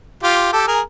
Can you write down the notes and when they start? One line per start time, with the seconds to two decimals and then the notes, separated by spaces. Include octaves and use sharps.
0.23 F4 G4
0.52 G4 A4
0.67 G#4 A#4